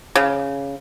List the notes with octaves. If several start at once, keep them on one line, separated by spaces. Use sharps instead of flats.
C#3